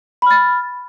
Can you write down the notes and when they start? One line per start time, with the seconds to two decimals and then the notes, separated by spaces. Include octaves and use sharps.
0.22 B5
0.26 F6
0.31 A6